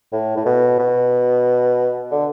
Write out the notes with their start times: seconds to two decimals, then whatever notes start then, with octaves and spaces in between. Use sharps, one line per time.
0.12 A2
0.37 A2
0.46 B2
0.79 B2
2.11 D3